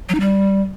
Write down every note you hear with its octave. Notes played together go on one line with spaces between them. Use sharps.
F#3
D#4
G3